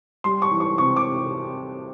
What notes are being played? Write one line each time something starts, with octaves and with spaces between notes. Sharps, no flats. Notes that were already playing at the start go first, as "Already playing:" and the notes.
G3 C6
C#6
E3
C#6
C3 C#6
D6